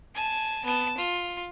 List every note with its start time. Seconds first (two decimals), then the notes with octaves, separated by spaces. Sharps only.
0.15 G#5 A5
0.65 B3 A5
0.98 F4